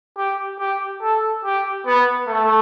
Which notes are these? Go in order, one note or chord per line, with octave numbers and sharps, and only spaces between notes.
G4
G4
A4
G4
B3
A3